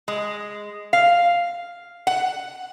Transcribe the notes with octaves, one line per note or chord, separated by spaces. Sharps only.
G#3
F5
F#5